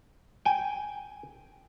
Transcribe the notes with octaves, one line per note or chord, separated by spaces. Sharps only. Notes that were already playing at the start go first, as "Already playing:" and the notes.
G5 G#5